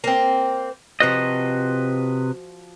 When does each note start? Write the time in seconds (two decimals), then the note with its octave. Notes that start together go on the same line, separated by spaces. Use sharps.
0.04 A#3 C4
1.00 C3 F3 F#4 B4 D#5